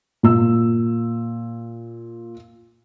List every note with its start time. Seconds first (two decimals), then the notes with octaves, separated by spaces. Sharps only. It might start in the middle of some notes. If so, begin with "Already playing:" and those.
0.23 A#2 E6